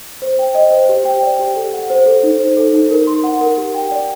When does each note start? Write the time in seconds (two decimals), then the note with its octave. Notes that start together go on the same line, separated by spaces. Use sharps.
0.22 C5
0.39 G5
0.55 D#5
0.72 C5
0.89 G4
1.05 G5
1.23 D5
1.39 G4
1.56 A4
1.73 F#5
1.90 C5
2.06 A4
2.23 D#4
2.40 C5
2.57 A4
2.73 D#4
2.91 A#4
3.07 C6
3.24 F#5
3.41 A#4
3.58 G4
3.74 G5
3.91 D5